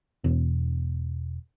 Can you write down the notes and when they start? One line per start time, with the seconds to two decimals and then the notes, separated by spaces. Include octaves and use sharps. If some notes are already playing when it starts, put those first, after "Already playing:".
0.24 E1